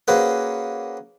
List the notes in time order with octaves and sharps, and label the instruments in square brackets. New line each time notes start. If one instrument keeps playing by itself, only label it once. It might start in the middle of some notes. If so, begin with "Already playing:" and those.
[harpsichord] A#3 C#4 F#4 G#4 B4 C5